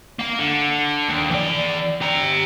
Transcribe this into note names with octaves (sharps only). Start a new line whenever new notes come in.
A#3 F5
D3
D#2
E3 D5
G4 A#5